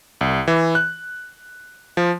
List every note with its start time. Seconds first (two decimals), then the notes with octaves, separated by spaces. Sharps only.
0.21 C2
0.48 E3
0.75 F#6
1.97 F3